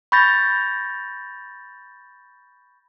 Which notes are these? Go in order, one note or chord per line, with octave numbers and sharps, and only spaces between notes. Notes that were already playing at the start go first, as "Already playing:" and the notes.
B5 C#6 G6 A6 A#6